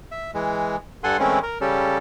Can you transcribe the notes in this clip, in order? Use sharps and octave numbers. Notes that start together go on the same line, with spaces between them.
E5
E3 G#3
G2 A4 F#5 G#5 C6
E3 G#3 A3 C4 C#4 E4
A#4
C#3 G3 C#4 G4 A4